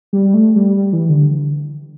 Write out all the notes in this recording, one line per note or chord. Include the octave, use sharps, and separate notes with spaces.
G3
A3
G3
G3
E3
D3